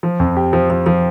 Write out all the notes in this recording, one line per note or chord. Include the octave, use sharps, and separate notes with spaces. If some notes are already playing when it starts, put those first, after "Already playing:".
F3
F2
G4
F3
F3
F3